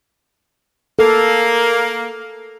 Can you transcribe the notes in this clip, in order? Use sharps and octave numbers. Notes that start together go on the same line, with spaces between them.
A#3 A4